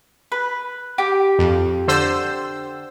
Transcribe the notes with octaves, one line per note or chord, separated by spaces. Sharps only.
B4
G4
F2
D3 C5 E6